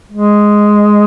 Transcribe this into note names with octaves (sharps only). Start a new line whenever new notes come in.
G#3